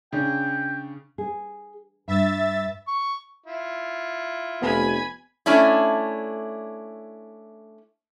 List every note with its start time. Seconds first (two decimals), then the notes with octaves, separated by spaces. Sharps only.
0.13 C#3 D4 G5
1.18 G#4
2.08 G2 E5 A6
2.88 C#6
3.46 E4 F4
4.62 F1 B3 G#5 B5
5.46 A3 C#4 D4 E4